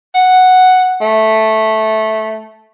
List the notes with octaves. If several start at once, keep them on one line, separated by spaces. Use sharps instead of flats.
F#5
A3